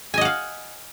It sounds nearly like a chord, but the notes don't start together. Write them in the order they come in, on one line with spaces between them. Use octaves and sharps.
G#5 D#5 F#5 F5